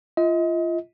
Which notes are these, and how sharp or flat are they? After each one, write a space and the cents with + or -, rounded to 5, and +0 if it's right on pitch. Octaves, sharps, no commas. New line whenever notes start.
F4 -25 D#5 +35